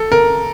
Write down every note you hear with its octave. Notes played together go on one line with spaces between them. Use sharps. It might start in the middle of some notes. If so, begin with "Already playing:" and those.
Already playing: A4
A#4